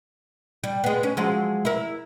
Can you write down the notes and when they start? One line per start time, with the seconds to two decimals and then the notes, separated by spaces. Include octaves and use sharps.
0.64 G3
0.84 G#3 B3
1.03 C#4
1.17 F3 F#3 G#3
1.65 E4 A#4